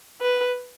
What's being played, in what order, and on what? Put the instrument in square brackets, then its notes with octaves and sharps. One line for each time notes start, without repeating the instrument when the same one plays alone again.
[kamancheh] B4